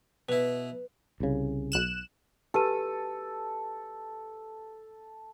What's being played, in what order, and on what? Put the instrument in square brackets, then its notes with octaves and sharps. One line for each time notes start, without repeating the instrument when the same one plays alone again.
[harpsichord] B2 E4 [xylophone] B4
[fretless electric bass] C2 C#3
[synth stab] B1 F#6 E7
[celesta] G4 B4 D#7 [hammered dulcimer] A4